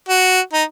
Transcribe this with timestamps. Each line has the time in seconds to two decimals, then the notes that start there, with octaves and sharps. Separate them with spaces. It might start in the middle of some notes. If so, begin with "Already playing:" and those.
0.09 F#4
0.53 D#4